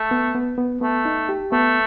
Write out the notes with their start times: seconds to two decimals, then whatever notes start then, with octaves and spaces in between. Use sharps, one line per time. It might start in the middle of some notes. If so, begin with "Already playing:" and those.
Already playing: A3
0.11 B3
0.35 B3
0.58 B3
0.81 A3 B3
1.05 D#4
1.29 G4
1.52 A3 B3